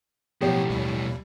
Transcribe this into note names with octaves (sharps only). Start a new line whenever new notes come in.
B1 A2 F3 B3 G4 C#5
D#2 G3